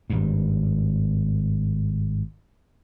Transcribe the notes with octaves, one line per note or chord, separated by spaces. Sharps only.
G#1 G2